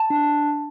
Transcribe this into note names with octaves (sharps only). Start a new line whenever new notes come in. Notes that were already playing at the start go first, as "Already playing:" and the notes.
Already playing: A5
D4